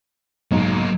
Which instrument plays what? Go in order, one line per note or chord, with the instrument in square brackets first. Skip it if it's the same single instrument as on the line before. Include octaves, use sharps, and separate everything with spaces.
[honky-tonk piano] B1 G#2 [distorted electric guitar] F#3 A#3